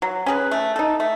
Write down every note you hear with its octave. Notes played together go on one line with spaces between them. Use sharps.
F#3
C#4 G#4 B4
A3
D#4 A4
A3